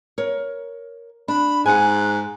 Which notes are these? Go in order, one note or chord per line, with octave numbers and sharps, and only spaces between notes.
A#4 C#5
D4 B5
G#2 F#5 G#5 F#6